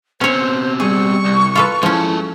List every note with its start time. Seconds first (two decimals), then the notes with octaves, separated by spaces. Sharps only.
0.21 B2 C4 C#4 C5 C#5
0.80 G3 G#4 C#6
1.25 C2
1.55 F4 A4 B4
1.83 F3 G#3 C#4 E4 A4